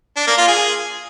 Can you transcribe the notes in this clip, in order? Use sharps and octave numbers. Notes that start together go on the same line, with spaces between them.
D4
A#3
F4
G#4